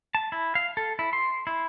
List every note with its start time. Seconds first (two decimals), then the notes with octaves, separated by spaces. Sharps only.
0.15 A5
0.32 E4
0.55 F5
0.77 A4
0.99 E4
1.13 C6
1.47 E4